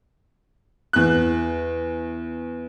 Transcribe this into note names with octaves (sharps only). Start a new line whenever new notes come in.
E2 F#6